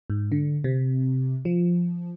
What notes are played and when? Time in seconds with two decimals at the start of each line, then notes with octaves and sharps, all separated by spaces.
0.10 G#2
0.32 D3
0.64 C3
1.45 F3